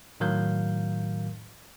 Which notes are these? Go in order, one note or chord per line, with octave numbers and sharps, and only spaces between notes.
A2 D#3 F#3 A#4 F5 G6